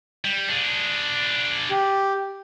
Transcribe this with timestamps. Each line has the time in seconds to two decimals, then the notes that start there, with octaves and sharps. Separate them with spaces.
0.25 G3
0.48 D4 G#4
1.70 G4